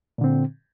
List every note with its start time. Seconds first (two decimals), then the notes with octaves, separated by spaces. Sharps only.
0.18 A#2
0.21 D3
0.24 C4